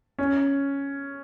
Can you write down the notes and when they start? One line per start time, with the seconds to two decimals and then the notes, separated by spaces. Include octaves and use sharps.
0.19 C#4